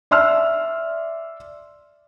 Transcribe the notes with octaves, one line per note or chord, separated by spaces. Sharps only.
D5 E5 C6 E6 F6